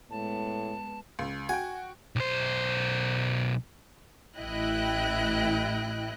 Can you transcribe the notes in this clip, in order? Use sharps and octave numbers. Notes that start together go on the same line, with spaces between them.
A2 G#3 B3 A5
C#2
F#4 G5 G#5
B1 C5
A1 E4 D#5 G5 F#6